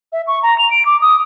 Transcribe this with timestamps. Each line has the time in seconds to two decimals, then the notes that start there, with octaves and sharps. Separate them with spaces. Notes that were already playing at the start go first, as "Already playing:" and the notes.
0.12 E5
0.27 C#6
0.43 A#5
0.58 F7
0.70 D7
0.86 D6
1.01 D#6